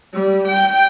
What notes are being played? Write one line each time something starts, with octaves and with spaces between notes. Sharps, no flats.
G3
G5